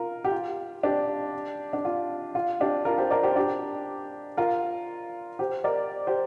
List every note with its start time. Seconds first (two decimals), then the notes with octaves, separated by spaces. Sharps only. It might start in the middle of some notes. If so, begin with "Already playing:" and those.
Already playing: F4 A#4
0.24 G4
0.31 F4
0.83 D4 G4
1.73 D4
1.85 F4
2.35 F4
2.60 D4 G4
2.85 F4 A#4
2.98 G4 C5
3.11 A#4 D5
3.23 G4 C5
3.36 D4 G4
4.37 F4 A#4
5.39 G4 C5
5.64 A#4 D5
6.07 G4 C5